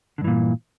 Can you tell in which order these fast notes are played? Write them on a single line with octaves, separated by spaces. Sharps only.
D3 G2 E3 A#2